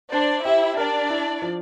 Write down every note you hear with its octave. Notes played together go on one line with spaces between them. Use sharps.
D4 C5 D5
E4 G4 E5
D4 A#4 D5
E4
F3